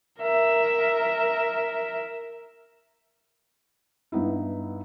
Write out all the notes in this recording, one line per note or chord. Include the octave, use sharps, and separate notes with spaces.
A#4 E5
G2 B3 D#4 E4